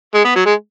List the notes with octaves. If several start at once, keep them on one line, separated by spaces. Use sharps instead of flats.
G#3
B3
F#3
G#3